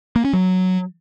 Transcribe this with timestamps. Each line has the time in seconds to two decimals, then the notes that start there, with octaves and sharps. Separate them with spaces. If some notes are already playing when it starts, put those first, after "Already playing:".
0.16 A#3
0.24 C#4
0.33 F#3